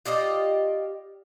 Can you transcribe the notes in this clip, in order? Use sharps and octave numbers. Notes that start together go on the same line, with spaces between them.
F4 G4 D5 D#5